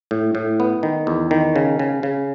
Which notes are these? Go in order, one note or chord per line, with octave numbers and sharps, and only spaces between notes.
A2
A2
B3
D#3
E2
D#3
C#3
C#3
C#3